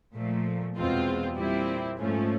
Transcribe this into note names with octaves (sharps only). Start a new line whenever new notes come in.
A#2 F3 A3
E2 B2 G#3 C4 F4
A#2 G3 C4 E4
G#2 F3 A3 C#4